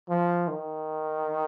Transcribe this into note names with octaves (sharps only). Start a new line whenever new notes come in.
F3
D#3